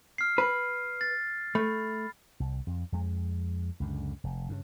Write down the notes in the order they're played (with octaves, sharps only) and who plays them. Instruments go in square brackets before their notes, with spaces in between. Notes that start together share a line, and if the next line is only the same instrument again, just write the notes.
[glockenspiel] F6 C7
[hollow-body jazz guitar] B4
[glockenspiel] A6
[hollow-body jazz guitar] A3 [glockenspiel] B5
[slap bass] C2
F2
F2 G#3
C#2 F#2 D3
F1
G2 C#3